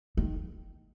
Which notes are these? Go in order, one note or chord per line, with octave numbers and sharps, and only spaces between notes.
D#3